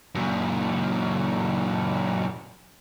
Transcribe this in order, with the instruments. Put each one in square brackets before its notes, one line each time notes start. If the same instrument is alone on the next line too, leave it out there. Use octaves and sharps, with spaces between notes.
[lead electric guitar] F#2 A#2